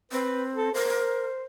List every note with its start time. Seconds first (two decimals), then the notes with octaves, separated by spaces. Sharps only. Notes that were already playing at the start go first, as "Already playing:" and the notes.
0.12 C4 B4
0.55 A4
0.74 A#4 C5